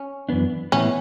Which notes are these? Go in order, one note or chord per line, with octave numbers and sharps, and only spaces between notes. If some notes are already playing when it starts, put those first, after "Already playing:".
Already playing: C#4
F#2 E3 B3 D4
A2 E3 B3 C#4 E4